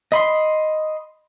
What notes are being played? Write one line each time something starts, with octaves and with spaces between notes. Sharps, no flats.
D#5 B5 C6